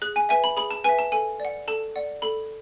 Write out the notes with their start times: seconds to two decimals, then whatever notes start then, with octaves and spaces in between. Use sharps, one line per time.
0.02 G#4 F#6
0.16 G#5
0.29 B4 E5 G#5
0.44 B5
0.57 G#4 B5
0.71 A5
0.84 B4 E5 G#5
0.99 A5
1.12 A4 G#5
1.40 D5
1.45 F#5
1.68 A4 A5
1.96 D5 F#5
2.22 A4 B5